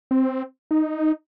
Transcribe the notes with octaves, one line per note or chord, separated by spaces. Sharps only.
C4
D#4